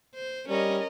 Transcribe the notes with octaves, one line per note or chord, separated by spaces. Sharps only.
C5
G3 C#4 A#4 D#5